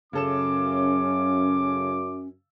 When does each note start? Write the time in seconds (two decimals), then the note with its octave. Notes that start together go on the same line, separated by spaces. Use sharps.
0.13 F#2 C#3 C#4 A4 D6 E7